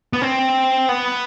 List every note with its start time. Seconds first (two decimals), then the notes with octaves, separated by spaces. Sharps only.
0.13 B3
0.22 C4
0.89 B3